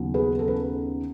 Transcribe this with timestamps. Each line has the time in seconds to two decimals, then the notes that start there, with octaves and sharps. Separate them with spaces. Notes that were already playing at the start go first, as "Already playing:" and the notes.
Already playing: D#2 C#3 F#3 B3
0.14 G#4 B4
0.39 A4
0.48 B4